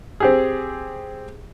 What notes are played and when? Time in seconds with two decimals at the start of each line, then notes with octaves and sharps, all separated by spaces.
0.20 C4 G4 G#4